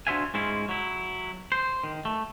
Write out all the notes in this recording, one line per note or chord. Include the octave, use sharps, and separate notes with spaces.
D4 F#4 C5 E5 F5 G#5
G#2 G#3 C#4 E4 F4
F#3 E4
C5
D#3
A3